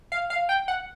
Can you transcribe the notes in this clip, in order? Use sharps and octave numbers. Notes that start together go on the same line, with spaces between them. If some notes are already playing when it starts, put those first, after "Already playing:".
F5
F5
G5
F#5